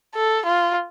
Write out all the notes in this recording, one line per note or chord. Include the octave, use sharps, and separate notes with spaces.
A4
F4